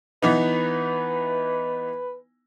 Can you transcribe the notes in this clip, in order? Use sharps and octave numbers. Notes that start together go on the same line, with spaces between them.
E3 B3 D#4 B4